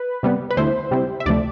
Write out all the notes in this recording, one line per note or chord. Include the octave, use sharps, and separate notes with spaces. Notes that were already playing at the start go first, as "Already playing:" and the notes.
Already playing: B4
C3 G3 B3
B4
D2 D3 A3 E4 C5
C3 G3 C4 E4
E5
D2 C3 F3 A3 D5